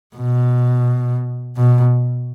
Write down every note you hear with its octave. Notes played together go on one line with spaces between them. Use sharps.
B2
B2